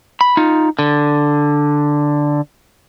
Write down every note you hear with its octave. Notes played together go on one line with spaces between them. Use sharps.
B5
D#4 F4
D3